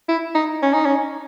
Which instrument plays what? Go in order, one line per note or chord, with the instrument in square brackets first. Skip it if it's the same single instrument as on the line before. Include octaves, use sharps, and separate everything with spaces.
[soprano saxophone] E4
D#4
C#4
D#4
C#4